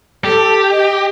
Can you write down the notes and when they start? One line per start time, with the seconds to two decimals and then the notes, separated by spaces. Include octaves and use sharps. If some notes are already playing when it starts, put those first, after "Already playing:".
0.24 G4 A4 A5
0.69 D#5